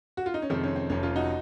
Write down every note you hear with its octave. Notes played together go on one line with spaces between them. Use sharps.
F#4
F4
D#4
C#4
F2 C3 D#3 G#3 C4
C#4
C4
F1 F2 C3 C#4
C#4 F4
D#4 F#4